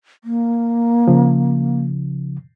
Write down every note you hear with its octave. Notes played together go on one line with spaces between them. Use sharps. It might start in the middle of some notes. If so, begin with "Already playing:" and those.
A#3
C#3 F3